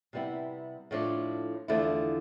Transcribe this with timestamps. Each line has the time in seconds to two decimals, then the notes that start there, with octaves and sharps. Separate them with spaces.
0.13 C3 G3 B3 E4
0.91 A2 F3 A3 D4
1.68 E2 D3 F3 A3 E4